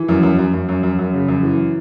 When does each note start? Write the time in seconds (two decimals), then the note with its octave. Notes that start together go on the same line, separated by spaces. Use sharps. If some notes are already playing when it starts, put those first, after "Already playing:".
Already playing: E3
0.09 F#2
0.23 F#2
0.39 F#2
0.53 F#2
0.69 F#2
0.83 F#2
0.99 F#2
1.13 C#3
1.28 F#2
1.43 E3